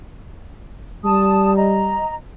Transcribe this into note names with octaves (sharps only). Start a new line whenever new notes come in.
G3 A5 D#6
D#5 A#5